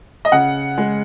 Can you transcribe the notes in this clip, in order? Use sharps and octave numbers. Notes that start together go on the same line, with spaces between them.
D#5
C#3 F#5
G#3